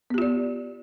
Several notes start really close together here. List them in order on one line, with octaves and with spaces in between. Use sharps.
B3 G4 F4 D5